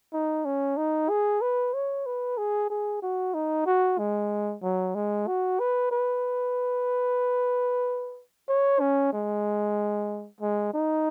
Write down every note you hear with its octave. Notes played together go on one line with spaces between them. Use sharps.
D#4
C#4
D#4
G#4
B4
C#5
B4
G#4
G#4
F#4
D#4
F#4
G#3
F#3
G#3
F#4
B4
B4
C#5
C#4
G#3
G#3
D#4